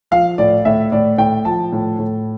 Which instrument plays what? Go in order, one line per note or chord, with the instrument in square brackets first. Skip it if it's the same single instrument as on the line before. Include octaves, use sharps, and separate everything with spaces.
[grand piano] F3 F5
A2 D5
A2 E5
A2 D5
A2 G5
F3 A5
A2
A2